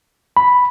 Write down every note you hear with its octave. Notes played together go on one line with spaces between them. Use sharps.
B5